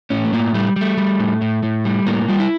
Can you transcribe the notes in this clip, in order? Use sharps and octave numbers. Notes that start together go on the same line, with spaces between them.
A2 C#4
A3
A2 A#3
G3 A3
G3 A3
G3
A2
A2
A2
G3
A2 A#3
G3 F4
E4